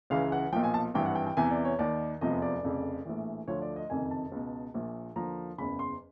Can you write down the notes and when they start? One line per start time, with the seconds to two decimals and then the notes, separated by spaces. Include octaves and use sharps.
0.10 C#2 C#3 E3 F5
0.32 F#5
0.53 B1 A#2 F3 G5
0.63 G#5
0.74 A5
0.94 G#1 G2 E3 G5
1.06 F#5
1.15 G5
1.26 G5
1.37 E2 C3 E3 G#5
1.51 D5
1.65 C#5
1.79 D#2 D#3 D5
2.21 F1 E2 C3 F3 D#5
2.42 D5
2.63 F1 F2 C#3
3.06 A#1 A2 E3
3.48 D2 D3 F3 C#5
3.62 D5
3.76 D#5
3.90 F#1 F2 C3 D#3 G#5
4.11 A5
4.32 C#2 B2
4.74 A#1 A#2 F3
5.16 D#2 D3 F3 A#5
5.58 F#1 E2 C#3 B5
5.79 C6